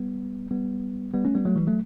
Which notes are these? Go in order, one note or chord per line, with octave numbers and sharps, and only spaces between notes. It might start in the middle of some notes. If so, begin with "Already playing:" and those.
Already playing: G3 B3
G3 B3
G3 B3
A3 C#4
G3 B3
F#3 A3
E3 G3
F#3 A3